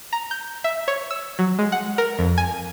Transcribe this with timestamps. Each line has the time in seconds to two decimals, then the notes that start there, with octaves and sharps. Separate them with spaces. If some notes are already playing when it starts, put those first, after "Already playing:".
0.13 A#5
0.31 G6
0.64 E5
0.88 C#5
1.11 E6
1.39 F#3
1.59 G#3
1.72 F#5
1.98 A#4
2.19 F2
2.38 G#5